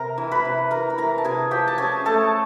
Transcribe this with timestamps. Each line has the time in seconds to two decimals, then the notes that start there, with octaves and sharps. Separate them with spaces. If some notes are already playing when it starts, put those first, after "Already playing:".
Already playing: C3 A#4 A#5
0.18 E3
0.31 B4 B5
0.45 C3
0.71 E3 A#4 A#5
0.90 B5
0.98 E3 A#4 A#5
1.18 A5
1.25 C3 G#4 G#5
1.51 F3 G4 G5
1.68 A5
1.78 C#4 G#4 G#5
2.05 A3 A4 A5